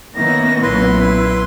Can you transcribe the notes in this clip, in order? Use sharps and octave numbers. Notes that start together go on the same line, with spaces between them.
D#3 A#3 B3 C#4 E4 A#6
B1 A#2 E4 B4 C6